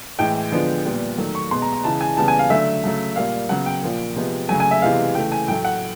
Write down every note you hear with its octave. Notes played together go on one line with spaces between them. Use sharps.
A2 E3 G#3 G5
D3 F3 G#3 B3
A#2 G3 B3
D#3 F#3 A3
C#6
B2 G#3 B3 C6
A#5
A#5
C#3 E3 G#3 A5
G#5
C#3 E3 G3 B3 A5
G#5
F5
D3 F#3 A3 E5
C#3 F#3 A3
A#2 G3 A#3 F5
C#3 F#3 B3 F#5
G5
A#2 F3 A#3
C3 F3 G#3 B3
C#3 F#3 A3 G#5
G#5
E5
C3 E3 G#3 B3 F5
C#3 E3 A3 G5
G#5
A2 F#3 A3 G5
F#5